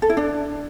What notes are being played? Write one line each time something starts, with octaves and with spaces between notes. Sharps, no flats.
A4
E4
D4